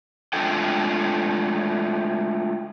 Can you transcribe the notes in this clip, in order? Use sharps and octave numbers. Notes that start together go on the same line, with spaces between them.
G#3 A3 D4 F4 A4 G5